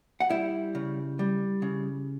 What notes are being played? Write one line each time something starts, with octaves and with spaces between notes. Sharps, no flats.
F#5
G3 E4 E5
C#3
G3
C#3